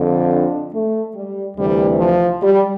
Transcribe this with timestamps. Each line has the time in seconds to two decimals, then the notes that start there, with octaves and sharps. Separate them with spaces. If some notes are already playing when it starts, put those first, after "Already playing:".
Already playing: F2 D3
0.30 D4
0.72 A3
1.14 G3
1.57 D2 C3 E3 G3
1.99 F3
2.41 G3